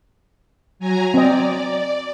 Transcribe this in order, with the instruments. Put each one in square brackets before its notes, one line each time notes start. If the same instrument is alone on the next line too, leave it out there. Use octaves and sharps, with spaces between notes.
[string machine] F#3 G#5 A#5
[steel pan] C4 D#5 [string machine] D5